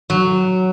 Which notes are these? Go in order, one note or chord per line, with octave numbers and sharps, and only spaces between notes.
F#3